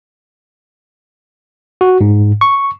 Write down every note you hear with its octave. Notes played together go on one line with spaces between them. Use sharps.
F#4
G#2
C#6